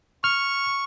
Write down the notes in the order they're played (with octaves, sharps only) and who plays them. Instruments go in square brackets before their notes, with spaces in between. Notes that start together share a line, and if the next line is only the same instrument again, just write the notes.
[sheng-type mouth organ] C#6 [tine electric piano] F6